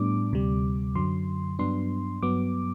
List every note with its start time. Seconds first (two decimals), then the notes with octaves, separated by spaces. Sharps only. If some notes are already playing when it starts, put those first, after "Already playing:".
Already playing: A2 G3 B3 D4 D6
0.32 D2 C3 G3
0.95 F#2 D3 F#3 C6
1.59 G2 F#3 B3 D4 C6
2.22 G2 F#3 B3 D6